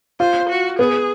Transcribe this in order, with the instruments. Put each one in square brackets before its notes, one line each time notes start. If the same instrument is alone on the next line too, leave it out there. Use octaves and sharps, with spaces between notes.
[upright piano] F4 [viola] C5
[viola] F#4
[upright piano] B3 [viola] G#4